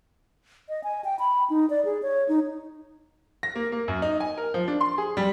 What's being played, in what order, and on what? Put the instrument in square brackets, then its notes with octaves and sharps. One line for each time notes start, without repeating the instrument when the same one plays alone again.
[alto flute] D#5
G#5
G5
B5
D#4
D5
G#4
C#5
D#4
[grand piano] A#6
A#3
A#3
F#2
D#4
G#5
A#4
F3
D4
C6
G#4
G3